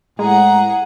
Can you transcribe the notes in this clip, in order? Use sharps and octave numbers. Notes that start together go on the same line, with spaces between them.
A2 G#3 G#4 F#5 A#5